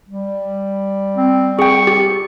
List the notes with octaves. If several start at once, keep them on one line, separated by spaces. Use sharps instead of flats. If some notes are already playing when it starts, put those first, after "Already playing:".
G3
C4
G#4 G5 C#6
G4